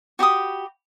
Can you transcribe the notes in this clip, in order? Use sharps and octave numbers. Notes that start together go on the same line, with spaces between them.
F#4 G4 B5 D#6